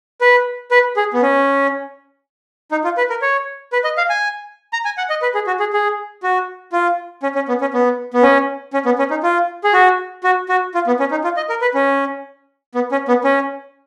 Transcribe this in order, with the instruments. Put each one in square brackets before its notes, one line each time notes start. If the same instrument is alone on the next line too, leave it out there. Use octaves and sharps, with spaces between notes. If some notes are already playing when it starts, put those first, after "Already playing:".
[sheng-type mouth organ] B4
B4
G#4
B3
C#4
D#4
F4
B4
A#4
C#5
B4
D#5
F5
G#5
A#5
G#5
F#5
D#5
B4
G#4
F#4
G#4
G#4
F#4
F4
C#4
C#4
B3
C#4
B3
B3
C#4
C#4
B3
C#4
D#4
F4
G#4
F#4
F#4
F#4
F4
B3
C#4
D#4
F4
D#5
A#4
B4
C#4
B3
C#4
B3
C#4